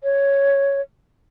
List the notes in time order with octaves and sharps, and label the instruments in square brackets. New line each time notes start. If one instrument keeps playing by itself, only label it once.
[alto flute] C#5